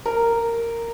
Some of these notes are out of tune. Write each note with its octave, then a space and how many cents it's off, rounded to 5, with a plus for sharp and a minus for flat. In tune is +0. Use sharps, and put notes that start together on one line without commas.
A#4 -10